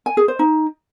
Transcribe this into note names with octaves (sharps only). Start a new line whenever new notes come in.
G#5
G#4
C5
D#4